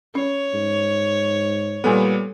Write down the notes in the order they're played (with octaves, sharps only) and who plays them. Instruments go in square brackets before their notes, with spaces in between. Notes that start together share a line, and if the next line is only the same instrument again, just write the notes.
[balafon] C#4 [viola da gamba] C#5
[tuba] G#2
[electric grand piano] A#2 G3 B3 [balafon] A4 G#5